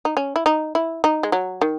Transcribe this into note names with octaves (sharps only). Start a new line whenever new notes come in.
D#4
C#4
E4
D#4
E4
D#4
G#3
F#3
D#3